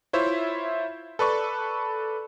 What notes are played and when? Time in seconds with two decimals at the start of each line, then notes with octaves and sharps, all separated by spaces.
0.13 E4 F4 C5 C#5 E5
1.19 A4 B4 D5 C#6